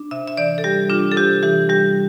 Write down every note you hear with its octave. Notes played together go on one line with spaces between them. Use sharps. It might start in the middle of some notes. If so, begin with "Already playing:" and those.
Already playing: D4
C3 E5
E5
E3 D5
A4
G3 G4
D4 F4
A4
C3 G4
E3 G4
G3 G4